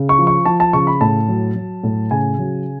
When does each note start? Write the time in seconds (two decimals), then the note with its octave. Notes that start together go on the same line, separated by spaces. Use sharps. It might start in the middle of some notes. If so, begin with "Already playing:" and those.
Already playing: C#3
0.09 C#6
0.19 F3
0.27 C#6
0.46 F3 A5
0.60 A5
0.73 C#3 C#6
0.87 B5
1.01 A2 A5
1.28 F#3
1.55 F#3
1.83 A2
2.10 C#3 G#5
2.38 F#3